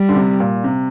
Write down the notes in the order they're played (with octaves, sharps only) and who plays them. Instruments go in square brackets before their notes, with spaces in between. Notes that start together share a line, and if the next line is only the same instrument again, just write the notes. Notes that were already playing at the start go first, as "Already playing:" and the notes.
Already playing: [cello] G3
[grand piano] D3
C3
A#2
C3